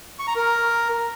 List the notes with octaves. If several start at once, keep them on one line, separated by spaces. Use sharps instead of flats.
C#6
A#5
A#4